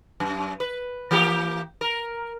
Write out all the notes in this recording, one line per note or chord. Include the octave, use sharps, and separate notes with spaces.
F#2
B4
E3 A#3 G4
A#4